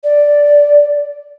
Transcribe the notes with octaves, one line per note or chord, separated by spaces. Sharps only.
D5